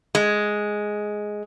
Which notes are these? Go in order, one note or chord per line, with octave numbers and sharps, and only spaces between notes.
G#3